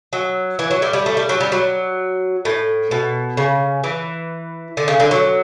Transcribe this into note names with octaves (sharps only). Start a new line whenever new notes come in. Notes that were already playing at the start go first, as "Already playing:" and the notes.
F#3
E3
F#3
G3
G3
A3
G3
F#3
G3
F#3
A2
B2
C#3
E3
D3
C#3
D3
F#3